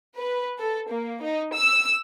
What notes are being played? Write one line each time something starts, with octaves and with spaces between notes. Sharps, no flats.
B4
A4
A#3
D#4
E6